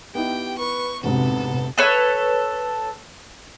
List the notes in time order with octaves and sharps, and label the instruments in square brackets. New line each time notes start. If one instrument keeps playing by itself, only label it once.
[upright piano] B3 D#4 E4 [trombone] G4 [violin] G5
[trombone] B4 [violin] C#6
[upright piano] F1 D2 G#2 [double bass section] C3 [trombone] B3 [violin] A4
[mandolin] A4 B4 C#5